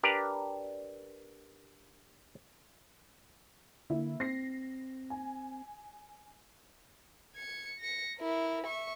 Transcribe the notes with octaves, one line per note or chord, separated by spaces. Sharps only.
D4 G4 A#4 B4 D5
D3 A#3 E4
C4 A#6 C7
G#5
G#6 C#7
A#6 C#7
E4 A#4
E5 C#6